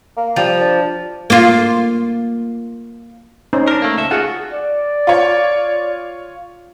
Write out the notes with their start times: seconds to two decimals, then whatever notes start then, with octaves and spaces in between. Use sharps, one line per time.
0.17 A#3
0.36 F3 G3
0.60 D4
1.30 A#3 F4
3.53 C#4 D#4 C5
3.68 D4 A#4
3.82 A3 A#3
3.97 C#2 A4 E5
4.11 F4 F#4 G#4 F#5
4.53 D5
5.07 F4 C#5